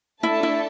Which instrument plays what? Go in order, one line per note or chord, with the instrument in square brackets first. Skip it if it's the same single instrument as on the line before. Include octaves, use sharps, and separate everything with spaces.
[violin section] A3 D4 A4 E5 A5 [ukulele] E4
[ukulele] E4